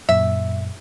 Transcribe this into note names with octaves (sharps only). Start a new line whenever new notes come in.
F#2 A#2 E5